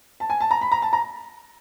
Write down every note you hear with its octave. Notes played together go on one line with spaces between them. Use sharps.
A5
G#5
A5
A#5
B5
A#5
A5
A#5